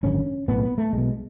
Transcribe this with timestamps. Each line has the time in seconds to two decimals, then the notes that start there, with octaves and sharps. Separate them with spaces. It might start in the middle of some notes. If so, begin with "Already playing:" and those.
0.03 G#1 F#2 D3 C#4
0.48 B1 A2 B3
0.63 B3
0.78 A3
0.93 B1 B2 G#3